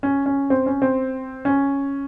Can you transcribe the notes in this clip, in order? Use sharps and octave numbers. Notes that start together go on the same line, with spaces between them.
C#4
C#4
C4
C#4
C4
C#4